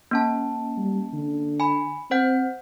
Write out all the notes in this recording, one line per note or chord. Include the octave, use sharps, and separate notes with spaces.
A#3 C#4 A5
G3
D3
G#5 B5
C4 C5 F#5 G6